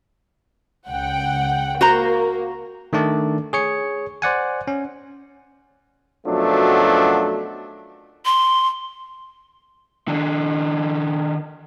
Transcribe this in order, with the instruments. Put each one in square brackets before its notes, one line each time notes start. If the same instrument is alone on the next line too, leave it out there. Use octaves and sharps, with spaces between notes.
[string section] C#2 F#5 G5
[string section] A#3 [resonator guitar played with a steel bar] F#4 C5 A#5
[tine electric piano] D#3 A3 D4 D5
G#4 C#5 C#7
C5 D5 F#5 G#5
C#4
[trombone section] F#2 B2 F3 F#3 A3 D4
[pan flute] C6
[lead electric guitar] D#3 D4